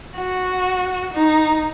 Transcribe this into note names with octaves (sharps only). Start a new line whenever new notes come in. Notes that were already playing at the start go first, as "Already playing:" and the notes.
F#4
D#4